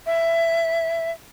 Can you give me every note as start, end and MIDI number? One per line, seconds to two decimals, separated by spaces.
0.06 1.11 76